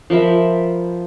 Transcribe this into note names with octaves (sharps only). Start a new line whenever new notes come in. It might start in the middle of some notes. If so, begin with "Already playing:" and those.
F3 A#4 E5 B5